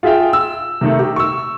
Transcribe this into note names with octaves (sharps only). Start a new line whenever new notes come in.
F4 G#4 E5 F5 G5
E6
C3 D#3 A3
G4
C#6 E6